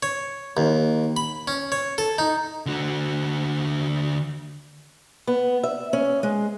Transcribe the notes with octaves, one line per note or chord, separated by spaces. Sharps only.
C#5
D#2
B5
C#4
C#5
A4
D#4
D3 F#4
B3
E5
C#4
G#3